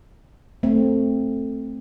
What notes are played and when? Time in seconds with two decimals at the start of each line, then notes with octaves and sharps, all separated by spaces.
0.63 A3 C4